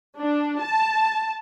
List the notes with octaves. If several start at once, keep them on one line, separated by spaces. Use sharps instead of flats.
D4
A5